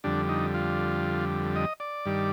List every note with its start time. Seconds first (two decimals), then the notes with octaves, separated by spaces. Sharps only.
0.04 F2 D3 G3 D4
0.29 D#4
0.54 F4
1.56 D#5
1.80 D5
2.06 G2 D#3 G3